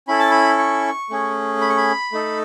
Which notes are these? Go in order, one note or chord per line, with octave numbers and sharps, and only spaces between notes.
C#4 E4 A4 B5
A5
B5
C#6
A3 C#4 G#4
B5
C#6
B5
A3 D#4 A4